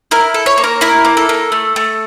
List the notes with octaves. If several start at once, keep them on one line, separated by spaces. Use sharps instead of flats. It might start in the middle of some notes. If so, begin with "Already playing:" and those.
E4 A#4
A4
C#5
A#3
A#4
E4 A#4
A#3
A4
A#3
A3
A3